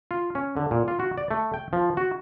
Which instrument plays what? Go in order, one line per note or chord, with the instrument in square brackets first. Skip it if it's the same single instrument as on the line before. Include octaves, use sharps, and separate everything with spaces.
[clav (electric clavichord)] F4
C#4
D3
A#2
F4
F#4
D5
A3
G5
F3
F#4